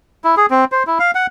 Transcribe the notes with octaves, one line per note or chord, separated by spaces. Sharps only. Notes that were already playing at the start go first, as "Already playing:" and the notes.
E4
G#4
C4
C5
E4
F5
F#5